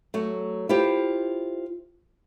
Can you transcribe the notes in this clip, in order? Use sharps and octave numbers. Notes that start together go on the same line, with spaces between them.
F#3 A3
E4 F4 G4 C5